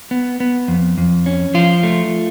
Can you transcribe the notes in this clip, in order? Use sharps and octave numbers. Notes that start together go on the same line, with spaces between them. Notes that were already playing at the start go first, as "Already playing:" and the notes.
B3
B3
F2
F2
C#4
F3 F4
A3